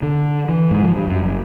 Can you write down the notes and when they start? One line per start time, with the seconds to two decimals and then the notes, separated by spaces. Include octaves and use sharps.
0.03 D3
0.49 E3
0.71 G#2
0.83 F3
0.96 G2
1.07 F#2
1.22 F#1